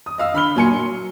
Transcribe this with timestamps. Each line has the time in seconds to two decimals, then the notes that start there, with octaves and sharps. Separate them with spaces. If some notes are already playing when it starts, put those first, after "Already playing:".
0.06 D#6
0.18 D#5 F5 E6
0.33 D3 B5 F6 G7
0.55 A#2 F#3 A#3 G#5 C6 C#7
0.73 F#3